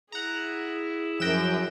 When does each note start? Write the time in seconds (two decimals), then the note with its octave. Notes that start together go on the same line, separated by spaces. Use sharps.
0.12 E4 G#4 F#5 A#5
1.20 F#2 F3 G5 F#6 A#6 E7